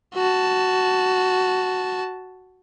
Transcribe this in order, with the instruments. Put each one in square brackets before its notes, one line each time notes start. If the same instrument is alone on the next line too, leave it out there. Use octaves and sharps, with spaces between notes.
[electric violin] F#4 A5